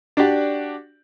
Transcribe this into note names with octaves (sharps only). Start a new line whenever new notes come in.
D4 F#4 G4 D5